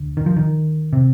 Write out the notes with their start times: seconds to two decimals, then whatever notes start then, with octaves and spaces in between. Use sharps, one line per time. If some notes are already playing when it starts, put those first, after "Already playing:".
Already playing: D2 D3
0.17 D#3
0.26 F3
0.37 D#3
0.93 C3